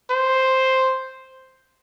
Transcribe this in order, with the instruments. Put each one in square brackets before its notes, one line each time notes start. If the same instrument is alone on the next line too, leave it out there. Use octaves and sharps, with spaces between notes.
[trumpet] C5